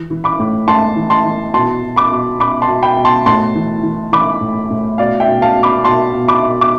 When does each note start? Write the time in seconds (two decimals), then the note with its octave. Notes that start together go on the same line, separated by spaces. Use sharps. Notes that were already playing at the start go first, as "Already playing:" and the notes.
Already playing: E3
0.10 E3
0.24 B5 D6
0.39 A2
0.67 A2 A5 C6
0.96 E3
1.10 A5 C6
1.26 E3
1.54 B2 A5 C6
1.83 B2
1.96 B5 D6
2.12 B2
2.39 B2 B5 D6
2.62 A5 C6
2.68 B2
2.83 G5 B5
2.97 B2
3.05 A5 C6
3.26 A2 A5 C6
3.55 E3
3.83 E3
4.12 E3 B5 D6
4.41 A2
4.70 A2
4.98 B2 D5 F5
5.20 E5 G5
5.28 B2
5.42 F5 A5
5.57 B2
5.63 B5 D6
5.84 B2 A5 C6
6.13 B2
6.28 B5 D6
6.43 B2
6.61 D6